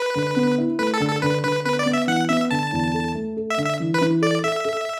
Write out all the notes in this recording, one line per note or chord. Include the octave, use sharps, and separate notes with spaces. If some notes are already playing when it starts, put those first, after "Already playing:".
Already playing: B4
D3
B3
E4
A3 B4
A4
D3
A4
D3 B4
D3 B4
B3 B4
D5
B3
E5
E3 F#5
B3 E5
D3 A5
E2
A4
A3
A4
E5
D3
E5
E3
B4
E3
A4 D5
A4 E5
A4